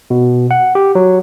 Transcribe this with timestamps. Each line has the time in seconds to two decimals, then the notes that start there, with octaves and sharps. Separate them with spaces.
0.10 B2
0.51 F#5
0.75 G4
0.95 F#3